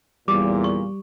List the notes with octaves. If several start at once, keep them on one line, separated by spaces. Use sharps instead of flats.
E2 A#2 G3 D6
C#6